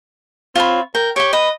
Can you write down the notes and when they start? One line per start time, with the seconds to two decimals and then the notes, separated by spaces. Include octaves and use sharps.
0.55 C4 F4 C#5 B5
0.95 A#4 G5
1.16 G4 C#5 G5
1.33 B4 D#5